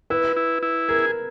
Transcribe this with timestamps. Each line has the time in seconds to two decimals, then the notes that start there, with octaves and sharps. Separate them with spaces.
0.10 E4 B4
0.36 E4
0.63 E4
0.89 G#4 A#4